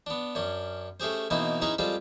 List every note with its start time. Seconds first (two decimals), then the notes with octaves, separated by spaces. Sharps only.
0.07 B3 D4
0.35 F#2 C#4 D4
1.00 A3 C#4 G4 G#4 C5
1.30 B2 E3 A#3 C4 D#4 E4
1.62 C#4 D#4 E4 G#4 B4 A#5
1.79 G3 G#3 C4 F4 A4 C5